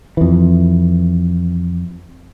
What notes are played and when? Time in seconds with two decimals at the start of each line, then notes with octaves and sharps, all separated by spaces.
0.17 F2 E3